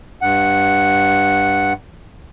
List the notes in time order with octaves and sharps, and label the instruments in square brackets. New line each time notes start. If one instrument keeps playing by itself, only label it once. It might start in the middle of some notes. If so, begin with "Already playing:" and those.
[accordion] G2 F#5